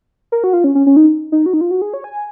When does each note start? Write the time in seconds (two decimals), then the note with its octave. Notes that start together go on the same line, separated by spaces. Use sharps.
0.32 A#4
0.44 F#4
0.53 F4
0.64 C#4
0.75 C#4
0.86 C#4
0.96 D#4
1.32 D#4
1.46 F#4
1.54 D#4
1.61 F4
1.71 F#4
1.82 G#4
1.94 C#5
2.04 G#5